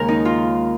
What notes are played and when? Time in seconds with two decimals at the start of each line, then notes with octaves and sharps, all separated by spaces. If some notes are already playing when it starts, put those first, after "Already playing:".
Already playing: D#2 C#3 G#3 A#4
0.08 D#4
0.25 F4